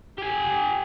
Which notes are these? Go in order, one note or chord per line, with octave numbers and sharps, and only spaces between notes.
G4 G#5